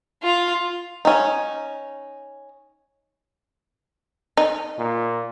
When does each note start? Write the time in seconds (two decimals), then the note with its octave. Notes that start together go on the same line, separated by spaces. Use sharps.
0.23 F4
1.05 C#4 D#4
4.37 D#4
4.78 A#2